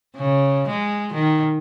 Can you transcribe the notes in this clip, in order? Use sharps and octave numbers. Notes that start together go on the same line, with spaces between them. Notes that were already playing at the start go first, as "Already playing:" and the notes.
C#3
G#3
D#3